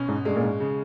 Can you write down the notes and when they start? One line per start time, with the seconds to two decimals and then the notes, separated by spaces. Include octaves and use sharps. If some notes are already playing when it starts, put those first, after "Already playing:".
Already playing: B2 C#4
0.08 G#2
0.25 G2 G#3
0.36 A#2
0.43 G#2
0.60 C#3